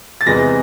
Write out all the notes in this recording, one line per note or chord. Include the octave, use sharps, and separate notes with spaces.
A6
E2 C3 E3 G#3 A#6